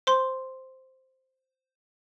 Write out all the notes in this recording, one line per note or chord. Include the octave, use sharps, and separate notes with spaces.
C5 C6 G7